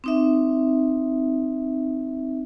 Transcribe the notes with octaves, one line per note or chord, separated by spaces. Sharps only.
C4 D#4 E5